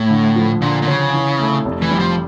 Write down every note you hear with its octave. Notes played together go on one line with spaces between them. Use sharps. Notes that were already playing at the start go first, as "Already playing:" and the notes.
Already playing: A2
D3
F3
A#2 D3
A#2
C#3 C#4
E3
A3
F1
E3
G3
F3